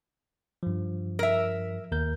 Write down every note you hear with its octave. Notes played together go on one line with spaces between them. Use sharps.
G2 F3
A#4 E5
D#2 A#4 G6